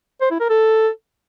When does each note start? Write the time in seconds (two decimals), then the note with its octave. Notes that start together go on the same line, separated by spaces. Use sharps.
0.21 C5
0.30 E4
0.40 A#4
0.49 A4